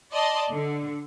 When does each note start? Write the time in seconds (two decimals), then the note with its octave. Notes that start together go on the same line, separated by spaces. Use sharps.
0.13 D5 D#5 A5 C6
0.52 D3